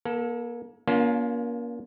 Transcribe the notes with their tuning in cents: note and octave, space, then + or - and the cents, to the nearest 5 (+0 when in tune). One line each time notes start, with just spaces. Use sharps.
A#3 +35 A4 +0
A#3 +30 C#4 +40 F4 +0